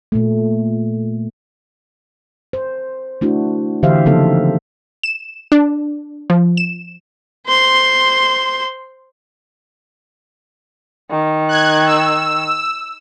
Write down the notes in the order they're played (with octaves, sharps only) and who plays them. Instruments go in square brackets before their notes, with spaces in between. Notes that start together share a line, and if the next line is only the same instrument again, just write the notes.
[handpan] A#2 A3
C5
A3 D4 E4 F#4
D3 E3 G4 C5 E5 F5
C#3 F3 A#3 C4 D#4 A4
[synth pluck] E7
D4
F3
E7
[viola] C5 C6
[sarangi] D#3
[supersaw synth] F#6 G#6
E6